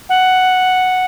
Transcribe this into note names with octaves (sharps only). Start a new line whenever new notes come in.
F#5